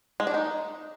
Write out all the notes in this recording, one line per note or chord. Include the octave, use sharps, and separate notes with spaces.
G#3
D4
D#4